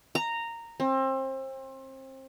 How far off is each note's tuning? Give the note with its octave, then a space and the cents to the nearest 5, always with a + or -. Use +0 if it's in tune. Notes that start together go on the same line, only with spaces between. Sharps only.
A#5 -10
C4 +30